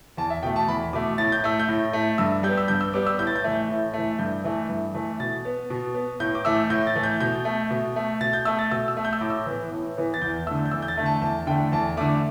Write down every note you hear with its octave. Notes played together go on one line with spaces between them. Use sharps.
E2 A5
E5
B2 A3 G5
A5
E2 B5
B2 A3 D6
A2 A6
G6
A3 E6
G6
A2
A3
G2 E6
G3 G6
B3
E6
G2 G6
E6
G3 B3 D6
E6
A2 G6
A6
G6
E3 A3
A2
E3 A3
G2 G6
E3 A3
G2
E3 A3
B2 A6
B3
B2
B3
A2 G6
D6
E3 A3 E6
A2 G6
A6
E3 A3
G6
B2 G6
A3
B2
A3
B2 A6
G6
A3 E6
A6
B2 E6
E6
A3
G6
E6
A2 D6
E6
E3 B3
A2
E3 B3
A6
E2 G6
D3 A3 E6
G6
E2 E6
G6
A6
D3 A3
A5
E2 A5
D3 A3 G5
E2 A5
D3 A3 D6